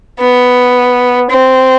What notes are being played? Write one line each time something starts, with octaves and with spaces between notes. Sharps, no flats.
B3
C4